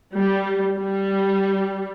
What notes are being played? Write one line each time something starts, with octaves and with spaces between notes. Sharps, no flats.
G3
G3